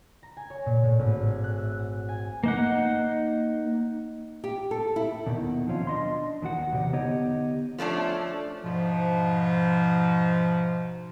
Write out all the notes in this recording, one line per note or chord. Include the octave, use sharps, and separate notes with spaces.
A#5
G#5
C#5
A#2
A2
G#1
G#4
F#6
E5
F#5
G#5
A#3 D#4 F#5
G4
A4
E4
D#2 B2 D#3
D#3 F3 F#3 C4 C#4 F4
D4 D#5 C6
D#2 D#3 F#4 F#5
E2 C3 G4 F#5
D3 B3 D#4 G4 C#5 D#5
F3 A3 C#4 D4
G#2 B2 F3